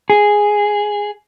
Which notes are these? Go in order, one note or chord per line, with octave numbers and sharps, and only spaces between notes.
G#4